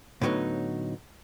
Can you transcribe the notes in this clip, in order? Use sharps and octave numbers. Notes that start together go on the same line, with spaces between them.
A2 D3 F#3 B3 D#4